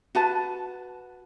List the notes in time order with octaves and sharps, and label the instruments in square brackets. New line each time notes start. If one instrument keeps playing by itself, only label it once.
[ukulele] F#4 B4 A5